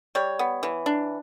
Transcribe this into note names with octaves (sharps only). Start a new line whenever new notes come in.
G3 C#5
B3
E3
D4